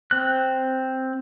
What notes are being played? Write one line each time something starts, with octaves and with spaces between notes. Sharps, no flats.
C4 F#6